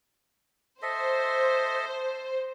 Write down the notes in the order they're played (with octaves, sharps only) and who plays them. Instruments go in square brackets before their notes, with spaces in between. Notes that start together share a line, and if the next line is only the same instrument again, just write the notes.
[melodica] A4 D#5 E5 [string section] C5